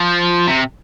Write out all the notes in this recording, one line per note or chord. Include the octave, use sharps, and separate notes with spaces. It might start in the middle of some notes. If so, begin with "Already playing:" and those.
Already playing: F3
C3